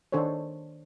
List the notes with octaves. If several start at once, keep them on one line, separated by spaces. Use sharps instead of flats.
D#3 D4 A4 C5 C#5